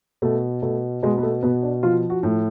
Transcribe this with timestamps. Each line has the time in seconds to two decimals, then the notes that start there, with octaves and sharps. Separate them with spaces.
0.22 B2 A3
0.62 B2 A3
1.03 B2 G#3
1.18 B3
1.23 A3
1.43 B2 B3
1.63 D4
1.83 F3 F4
2.10 F#4
2.23 A2